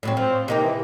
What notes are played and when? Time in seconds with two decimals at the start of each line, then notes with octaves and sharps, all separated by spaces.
0.03 A2 F#3 C4
0.17 F3 C4
0.48 C3 A#3 D#4 G4
0.62 E3